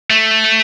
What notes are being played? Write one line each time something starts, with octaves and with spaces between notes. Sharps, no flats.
A3